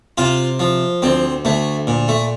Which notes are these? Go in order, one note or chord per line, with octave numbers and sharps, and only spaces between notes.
C3 F4
F3
D2 C4
D2 A3
A#2
A3